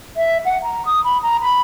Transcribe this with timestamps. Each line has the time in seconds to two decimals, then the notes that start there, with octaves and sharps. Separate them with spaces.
0.16 E5
0.44 F#5
0.63 A#5
0.85 D#6
1.03 B5
1.22 A#5
1.41 B5